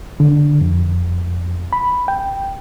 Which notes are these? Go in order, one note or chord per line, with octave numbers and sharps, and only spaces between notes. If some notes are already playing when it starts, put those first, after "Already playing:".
D3
F2
B5
G5